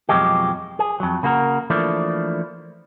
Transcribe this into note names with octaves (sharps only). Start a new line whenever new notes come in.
F2 B2 F3 F#3 G#3 G4
G#4
F2 F#3
C#3 A#3 F#4 A4 A#4
E3 F3 A3 A#3 D4